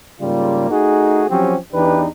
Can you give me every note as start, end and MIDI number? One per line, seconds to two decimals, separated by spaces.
0.21 0.67 44
0.21 0.67 49
0.21 0.67 55
0.21 0.67 58
0.21 0.67 65
0.70 1.25 57
0.70 1.25 63
0.70 1.25 66
0.70 1.25 68
1.29 1.56 53
1.29 1.56 54
1.29 1.56 60
1.29 1.56 61
1.29 1.56 67
1.73 2.06 40
1.73 2.06 52
1.73 2.06 62
1.73 2.06 63
1.73 2.06 67
1.73 2.06 71